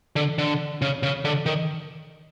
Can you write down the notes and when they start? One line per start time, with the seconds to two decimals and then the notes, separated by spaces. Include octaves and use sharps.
0.16 D3
0.38 D3
0.82 C#3
1.03 C#3
1.25 D3
1.46 D#3